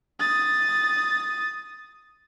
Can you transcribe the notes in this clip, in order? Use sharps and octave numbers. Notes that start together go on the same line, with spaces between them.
D#6 A6